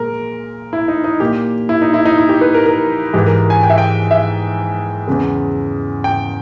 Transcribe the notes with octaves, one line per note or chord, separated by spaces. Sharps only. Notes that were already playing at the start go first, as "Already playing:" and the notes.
Already playing: A#2 G#3 A#4
E4
D#4
D#4
A#2 A#3 G4
E4
D#4
E4
D#4
E4
G4
B4
A#4
A#4
G#2 E3 G#3 G4
A#4
G#5
G5
E5
G5
E5
E2 C#3 G#3
G5